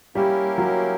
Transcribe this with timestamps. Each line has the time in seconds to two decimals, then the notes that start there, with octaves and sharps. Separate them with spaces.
0.15 G3 A#3 C#4 E4 G4 A#4
0.58 F#3